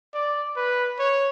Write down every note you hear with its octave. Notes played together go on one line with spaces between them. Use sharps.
D5
B4
C#5